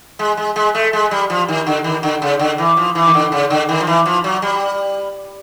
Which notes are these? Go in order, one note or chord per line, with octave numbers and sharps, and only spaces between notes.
G#3
G#3
G#3
A3
G#3
G3
F3
D#3
D3
D#3
D3
C#3
D3
E3
F3
E3
D#3
D3
C#3
D3
D#3
F3
E3
F3
F#3
G3